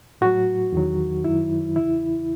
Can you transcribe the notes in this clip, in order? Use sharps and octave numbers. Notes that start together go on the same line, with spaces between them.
A2 F#3 F#4
E2 D#3 F#3
F#2 D#3 F#3 E4
E2 C#3 E3 E4